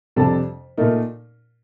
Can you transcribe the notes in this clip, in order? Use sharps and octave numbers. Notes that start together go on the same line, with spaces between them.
F2 C3 G3 D4 A4
A#2 A3 D#4 A#4